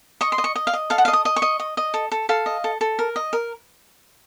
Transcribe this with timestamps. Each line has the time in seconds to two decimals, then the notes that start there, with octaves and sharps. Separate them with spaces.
0.21 D#5 C#6
0.32 C6
0.38 D#5
0.44 C#6
0.56 D#5
0.67 F5
0.73 D#5
0.90 A4 F5
0.98 F#5
1.05 F5
1.08 D#5
1.13 D#6
1.25 D#5
1.36 C#6
1.42 D#5
1.60 D#5
1.77 D#5
1.94 A4
2.12 A4
2.29 A4 F5
2.46 D#5
2.64 A4
2.81 A4
2.99 A#4
3.16 D#5
3.33 A#4